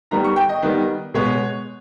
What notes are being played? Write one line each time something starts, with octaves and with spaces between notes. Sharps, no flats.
D#3 G3 B3 A#5
C#6
G5
D#5
D#3 G3 B3
B2 G#3 B3 C#5